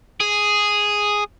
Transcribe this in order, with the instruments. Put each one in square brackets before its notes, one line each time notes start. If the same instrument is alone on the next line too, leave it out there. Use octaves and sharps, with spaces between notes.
[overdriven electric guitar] G#4